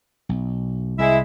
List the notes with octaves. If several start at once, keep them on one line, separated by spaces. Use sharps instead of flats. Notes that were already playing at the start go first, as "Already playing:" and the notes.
B1
C2 G#3 E4 E5